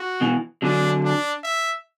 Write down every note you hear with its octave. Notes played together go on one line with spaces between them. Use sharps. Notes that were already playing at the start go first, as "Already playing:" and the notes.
Already playing: F#4
B2 E3
D3 F#3 D4
D4
E5